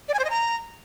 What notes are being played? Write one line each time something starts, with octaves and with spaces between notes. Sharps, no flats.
D5
G#5
C5
D#5
A#5